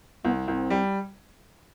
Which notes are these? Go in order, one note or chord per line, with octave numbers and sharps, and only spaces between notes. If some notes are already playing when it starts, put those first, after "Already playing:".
C2 B3
C2 C4
G3